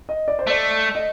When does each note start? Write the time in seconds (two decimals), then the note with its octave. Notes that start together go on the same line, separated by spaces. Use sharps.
0.09 D#5
0.28 D5
0.39 C5
0.47 A3 D5
0.95 D#5